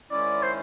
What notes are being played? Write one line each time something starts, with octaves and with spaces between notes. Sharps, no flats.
G#2 D#3 G#3 C#4 E4 D5
C5